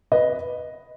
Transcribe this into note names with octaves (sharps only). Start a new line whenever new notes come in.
B4 D#5